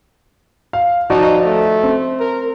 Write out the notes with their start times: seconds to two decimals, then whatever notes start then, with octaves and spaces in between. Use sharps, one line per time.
0.73 F5
1.10 F3 D#4 F#4 D5
1.45 A3
1.83 C4
2.20 A#4